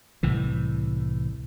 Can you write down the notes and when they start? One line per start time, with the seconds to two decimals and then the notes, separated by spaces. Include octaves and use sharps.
0.23 C2 A2 E3